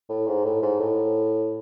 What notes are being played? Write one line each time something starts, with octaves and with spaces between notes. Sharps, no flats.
A2
G#2
A2
G#2
A2